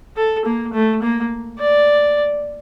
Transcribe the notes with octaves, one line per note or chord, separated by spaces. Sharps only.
A4
A#3
A3
A#3
D5